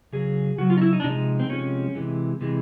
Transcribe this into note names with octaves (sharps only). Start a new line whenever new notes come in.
C#3 F#3 G#4
C#3 F#3 F#4
F4
D#4
E4
D#4
D4
C3 F3 G#3 D#4
C4
C3 F3 G#3 C#4
C3 E3 G#3
C3 E3 G#3